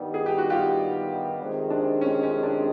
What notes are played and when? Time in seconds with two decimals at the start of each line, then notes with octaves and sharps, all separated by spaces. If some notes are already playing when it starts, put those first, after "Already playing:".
Already playing: G2 D#3 G3 B3 D#4
0.14 G#4
0.26 G4
0.38 F#4
0.50 F4 G4
1.39 F2 C3 D#3 G#3 C4
1.70 D4
2.01 C#4
2.23 C#4
2.43 D4